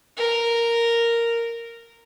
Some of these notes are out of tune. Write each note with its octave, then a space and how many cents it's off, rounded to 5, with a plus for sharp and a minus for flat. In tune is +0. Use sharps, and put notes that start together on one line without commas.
A#4 -5